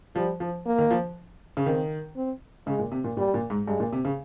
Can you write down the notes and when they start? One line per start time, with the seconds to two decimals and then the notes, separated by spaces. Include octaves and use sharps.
0.15 F3 G3
0.40 F3
0.66 A#3
0.78 D#3
0.91 F3
1.57 C#3
1.66 D#3 C4
2.17 C4
2.67 C#3 G#3
2.79 A#2
2.92 C3
3.04 A#2
3.17 A#2 G3
3.34 A#2
3.50 G#2
3.67 G2 G#3
3.80 A#2
3.93 C3
4.05 C#3